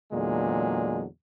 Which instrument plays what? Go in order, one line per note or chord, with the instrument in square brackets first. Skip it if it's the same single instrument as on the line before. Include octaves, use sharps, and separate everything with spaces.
[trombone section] E2 A#2 D3 F#3 G#3